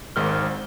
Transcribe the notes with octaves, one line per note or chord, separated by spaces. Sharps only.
G#1 G#2 D#3 F6